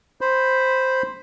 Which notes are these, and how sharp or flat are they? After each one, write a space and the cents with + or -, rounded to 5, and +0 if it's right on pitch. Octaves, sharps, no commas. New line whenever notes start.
C5 +0 B5 +0